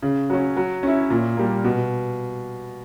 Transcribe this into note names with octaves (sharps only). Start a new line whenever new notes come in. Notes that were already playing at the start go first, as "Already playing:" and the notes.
C#3
F#3 C#4
F#3
C#4 E4
A#2
G3 A#3
B2